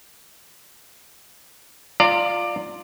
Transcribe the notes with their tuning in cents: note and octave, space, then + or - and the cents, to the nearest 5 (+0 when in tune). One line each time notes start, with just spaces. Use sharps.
F4 +0 D5 +15 A#5 -30